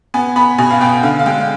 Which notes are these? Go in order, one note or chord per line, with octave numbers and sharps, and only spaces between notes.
B3 G#5
B3 B5
B2 G#5
F5
B3 G5
D3 F5
F5
G#3 G5
F5